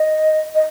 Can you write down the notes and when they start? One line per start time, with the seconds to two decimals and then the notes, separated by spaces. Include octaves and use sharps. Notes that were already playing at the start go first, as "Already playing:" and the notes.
Already playing: D#5
0.55 D#5